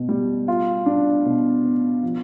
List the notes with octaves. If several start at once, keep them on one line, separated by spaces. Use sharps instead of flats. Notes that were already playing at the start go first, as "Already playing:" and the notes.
Already playing: B2
G3
F4
D4
B2
B3
F3